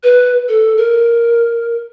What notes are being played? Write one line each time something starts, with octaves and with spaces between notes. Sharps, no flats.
B4
A4
A#4